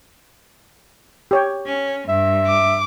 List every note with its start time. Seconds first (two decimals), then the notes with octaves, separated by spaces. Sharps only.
1.31 G4 C#5 G5
1.66 C#4
2.08 G2 E5
2.47 D6